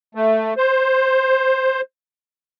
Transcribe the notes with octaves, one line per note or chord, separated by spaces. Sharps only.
A3
C5